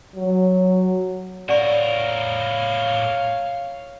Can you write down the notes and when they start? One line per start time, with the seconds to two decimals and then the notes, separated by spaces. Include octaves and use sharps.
0.15 F#3
1.49 A2 A#4 C#5 D5 F5 F#5 C#6